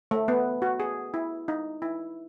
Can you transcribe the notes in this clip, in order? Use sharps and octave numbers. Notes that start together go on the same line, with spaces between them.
A3
B3
F#4
G#4
E4
D#4
E4